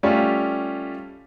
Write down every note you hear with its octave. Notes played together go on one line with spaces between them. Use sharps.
G3 A3 C#4 F4 G4